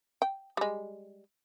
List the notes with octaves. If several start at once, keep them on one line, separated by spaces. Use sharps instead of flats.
G5
G3 G#3